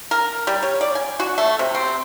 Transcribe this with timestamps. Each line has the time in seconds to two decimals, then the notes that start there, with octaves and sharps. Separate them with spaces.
0.11 A#4
0.47 G3
0.63 C#5
0.81 D5
0.95 G#5
1.20 F#4
1.38 A3
1.59 C3
1.75 C4